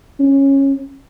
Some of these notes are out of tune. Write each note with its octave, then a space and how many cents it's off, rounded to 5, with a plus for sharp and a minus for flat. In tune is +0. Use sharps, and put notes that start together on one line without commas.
C#4 -15